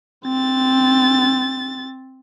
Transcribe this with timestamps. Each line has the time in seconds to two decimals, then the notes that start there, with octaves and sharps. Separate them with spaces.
0.25 C4 A6